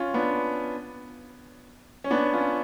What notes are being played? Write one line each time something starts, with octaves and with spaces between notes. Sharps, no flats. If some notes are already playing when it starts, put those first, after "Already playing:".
Already playing: C#4 F4
B3 D4
C#4
B3 D4
C#4 F4